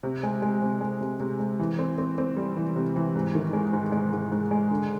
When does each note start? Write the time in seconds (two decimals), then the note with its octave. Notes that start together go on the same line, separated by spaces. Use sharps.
0.03 C3
0.23 G#3
0.42 G#3
0.62 C3
0.81 G#3
1.01 C3
1.20 C3
1.39 G#3
1.59 E3
1.79 C4
1.98 C4
2.18 C4
2.37 G3
2.57 E3
2.76 C3
2.96 E3
3.15 G#2
3.35 D#3
3.53 G#3
3.73 G#2
3.92 G#3
4.13 G#2
4.31 G#2
4.51 G#3
4.71 D3